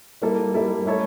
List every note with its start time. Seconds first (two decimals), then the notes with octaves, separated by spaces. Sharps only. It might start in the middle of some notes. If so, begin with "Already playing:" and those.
0.22 G3 A#3 E4 A4
0.54 G3 A#3 E4 A4
0.85 A3 C#4 E4 A4 C#5